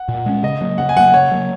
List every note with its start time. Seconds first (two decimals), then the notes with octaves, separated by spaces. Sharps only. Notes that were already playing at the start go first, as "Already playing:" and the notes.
Already playing: F#5
0.09 A#2
0.26 G#3 C#4
0.43 C#3 D#5
0.61 F#3 A#3
0.78 C#3 F#5
0.89 G#5
0.96 F#3 A#3 F#5
1.14 C#3 C#5
1.31 F#3 A#3